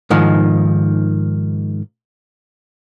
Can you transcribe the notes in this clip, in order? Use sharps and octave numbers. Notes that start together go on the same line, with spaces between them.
G#2 D#3 F3